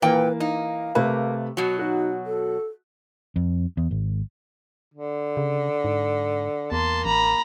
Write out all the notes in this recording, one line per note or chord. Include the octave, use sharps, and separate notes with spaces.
A#2 E3 A#3 B4 G5
D#4 F5
C3 A3 A#3 B4
B2 F#3 F#4
D#4 F#4
A4
F2
E2
G#1
D3
C#3
G#2
E2 A#3 A5 C6
A1 A#5 B5